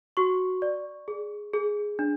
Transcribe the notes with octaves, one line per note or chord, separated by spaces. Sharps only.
F#4 C#6
D5
G#4
G#4
D4